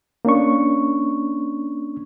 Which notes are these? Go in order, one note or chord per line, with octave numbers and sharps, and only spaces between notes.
A#3 C#4 D4 C#6